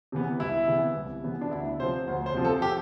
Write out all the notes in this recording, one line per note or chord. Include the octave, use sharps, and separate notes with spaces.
C3 E3 B3
C2 E4
C3 E3 B3
C2
C3 E3 B3
D4
D2 E4
C3 F3 C4 C5
D2 C5
C5
C3 F3 C4
A4
G4